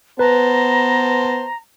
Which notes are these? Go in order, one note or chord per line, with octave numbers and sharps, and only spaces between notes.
B3 B4 C5 A5 A#5